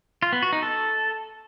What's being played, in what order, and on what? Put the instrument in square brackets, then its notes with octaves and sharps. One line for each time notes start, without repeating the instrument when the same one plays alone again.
[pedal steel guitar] F4
B3
F#4
D#4
A4